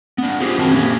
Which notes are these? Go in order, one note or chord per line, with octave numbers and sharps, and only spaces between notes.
B3 D4
F4 G4 G#4 C5
F#2 D#3 C4 F#4 A5
A#3 C#4 G4